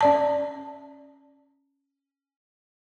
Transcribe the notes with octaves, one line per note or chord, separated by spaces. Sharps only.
C#4 D5 A5